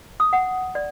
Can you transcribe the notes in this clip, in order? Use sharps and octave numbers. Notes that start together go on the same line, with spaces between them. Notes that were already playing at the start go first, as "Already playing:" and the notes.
D#6
F#5
D5